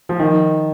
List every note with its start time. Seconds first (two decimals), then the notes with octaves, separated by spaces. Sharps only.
0.09 F3
0.19 D#3